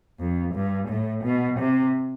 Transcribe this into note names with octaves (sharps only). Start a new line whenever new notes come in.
F2
G2
A2
B2
C3